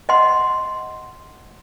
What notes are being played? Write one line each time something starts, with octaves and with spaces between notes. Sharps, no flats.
D#5 F#5 C6